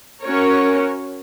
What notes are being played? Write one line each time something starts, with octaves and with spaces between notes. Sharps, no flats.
C#4 F#4 A#4 C#5